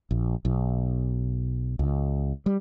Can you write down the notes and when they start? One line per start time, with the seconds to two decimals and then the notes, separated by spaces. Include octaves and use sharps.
0.11 A#1
0.45 B1
1.79 C#2
2.46 G3